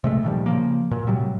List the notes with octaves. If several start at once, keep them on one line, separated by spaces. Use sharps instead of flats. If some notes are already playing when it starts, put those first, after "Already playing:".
C3 G#3 A3
A#2 D#3 F3 G3
C#3 F3 A#3
A#2
A2 C3 F#3 G3